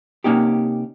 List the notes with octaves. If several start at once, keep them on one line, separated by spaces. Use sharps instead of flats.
C3 A#3 C#4 D#4 G4